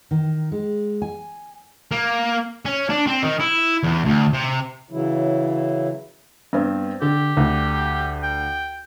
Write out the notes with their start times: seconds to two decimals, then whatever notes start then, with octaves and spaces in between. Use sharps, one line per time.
0.11 D#3
0.52 G#3
1.02 G#5
1.91 A#3
2.65 C#4
2.90 D4
3.07 C4
3.23 D#3
3.40 E4
3.83 E2
4.05 D2
4.33 C3
4.90 C#3 E3 F#3 E4
6.53 G2 B3 C4
7.02 D3 G4
7.37 D2
8.23 G5